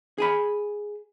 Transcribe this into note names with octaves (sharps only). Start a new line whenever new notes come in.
G#4 G#5 B5